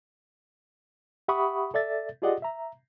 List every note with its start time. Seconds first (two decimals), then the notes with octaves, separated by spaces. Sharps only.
1.28 G4 E5 F#5 B5 C#6 D#6
1.74 A4 D5 E5 A6
2.22 F4 G4 G#4 D5 D#5 F#5
2.42 E5 A#5